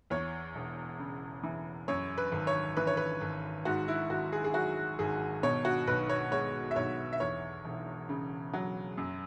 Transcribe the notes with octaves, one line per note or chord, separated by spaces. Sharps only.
E2 C#5
E1
C#3
E3
F#2 C#5
B4
G#1
C#5
E3 B4
C#5
B4
G#1
G#2 F#4
E4
G#1 F#4
G#4
G#4
F#3 F#4
G#1 G#4
B2 C#5
F#4
B1 B4
C#5
G#3 C#5
E5
B1 C#5
E5
E2 C#5
E1
C#3
F#3
F#2